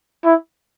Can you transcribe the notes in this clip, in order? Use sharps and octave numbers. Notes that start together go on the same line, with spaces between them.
E4